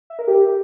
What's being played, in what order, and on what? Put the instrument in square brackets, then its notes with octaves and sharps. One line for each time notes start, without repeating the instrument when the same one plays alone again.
[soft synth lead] E5
A#4
G4